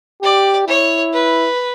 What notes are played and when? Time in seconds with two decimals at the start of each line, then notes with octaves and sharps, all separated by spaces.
0.22 G4 D5
0.68 E4 C#5
1.13 B4